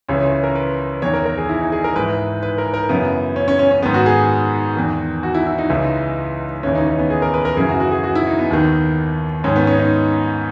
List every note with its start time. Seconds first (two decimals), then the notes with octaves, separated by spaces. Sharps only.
0.08 C#2 C#3 E3 C#4
0.20 C#4
0.32 C#4
0.44 A#4
0.55 B4
1.02 E2 D#3 C#5
1.14 A#4
1.25 A#4
1.37 G#4
1.49 E4
1.61 D#4
1.72 G#4
1.84 A#4
1.96 G#2 E3 B4
2.43 B4
2.58 A#4
2.74 A#4
2.89 F#2 C#3 E3 B3
3.36 C#4
3.48 C#4
3.59 C#4
3.71 C#4
3.82 G#2 D#3 B3
3.94 F#4
4.06 G#4
4.76 E2 D#3
5.23 F#4
5.35 E4
5.47 E4
5.58 D#4
5.70 C#2 C#3 E3
6.63 D#2 C#3 E3 C#4
6.75 D#4
6.87 C#4
6.99 B3
7.10 G#4
7.22 A#4
7.34 B4
7.45 A#4
7.57 F#2 C#3 E3 G#4
7.69 F#4
7.80 F#4
7.92 G#4
8.04 F#4
8.15 E4
8.27 D#4
8.39 B3
8.51 D#2 D#3
9.44 G#2 D#3 C#4
9.56 B3
9.67 C#4
9.79 D#4